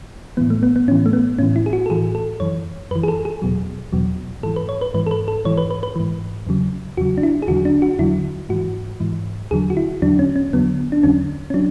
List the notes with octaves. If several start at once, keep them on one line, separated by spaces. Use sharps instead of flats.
A2 E3 B3
A3
B3
B3
A2 E3 C#4
A3
B3
A2 E3 C#4
E4
G#4
F#4
A4
A2 E3 G#4
A4
F#2 E3 C#5
F#2 E3 B4
G#4
A4
G#4
E2 B2 F#3
E2 B2 F#3
G#2 E3 A4
B4
C#5
B4
G#2 E3 B4
A4
B4
A4
G#2 E3 C#5
B4
B4
B4
G#2 E3
E2 C#3 F#3
E2 C#3 F#3 F#4
D4
E4
G#4
E2 D3 F#3 F#4
D4
F#4
E2 D3 F#3 E4
G#2 E3 F#4
G#2 E3
E2 D3 F#3 G#4
F#4
E4
E2 D3 F#3 D4
C#4
C#4
E2 D3 F#3 B3
D4
E2 D3 F#3 C#4
C#4
F#3 D4